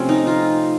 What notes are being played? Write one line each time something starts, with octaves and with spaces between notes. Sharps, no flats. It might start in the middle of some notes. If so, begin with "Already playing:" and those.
Already playing: C3 F3 A3 C4 C#4
D#4
F4